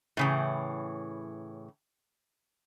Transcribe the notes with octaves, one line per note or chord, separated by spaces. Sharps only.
A2 C#3 E3